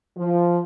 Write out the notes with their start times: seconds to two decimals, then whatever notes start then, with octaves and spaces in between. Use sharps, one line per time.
0.18 F3